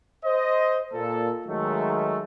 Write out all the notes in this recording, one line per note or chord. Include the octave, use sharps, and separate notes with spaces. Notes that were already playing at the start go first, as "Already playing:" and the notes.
C5 D#5
A#2 A4
D#3 F#3 G#3 A3